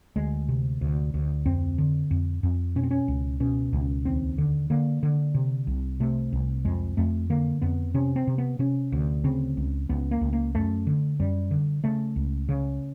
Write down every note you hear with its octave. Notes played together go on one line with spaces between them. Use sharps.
D2 G#3
C3
D2
D2
F2 C4
D3
F2
F2
B2 C#4
C4
C#4
C#2
B2 C#4
C#2
D#2 C4
D3
D3 A#3
D3
C3
C2
C3 A3
C2
F2 G#3
F2 A3
D3 A#3
F2 B3
C3 C#4
C4
C3
B3
C3 C#4
D2
C#3 C4
C#2
C#2 B3
A#3
C#2
A#3
F#2 A3
D3
F#2 G3
D3
C#3 A3
C#2
C#3